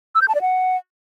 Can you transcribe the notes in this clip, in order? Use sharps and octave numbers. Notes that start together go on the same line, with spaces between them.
E6
G6
A5
D5
F#5